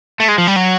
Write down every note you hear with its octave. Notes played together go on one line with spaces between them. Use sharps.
A3
G#3
F3
G3
F#3